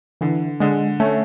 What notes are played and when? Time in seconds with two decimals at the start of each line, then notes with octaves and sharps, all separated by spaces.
0.21 D3 E3
0.60 D3 G#3
1.00 A3 C#4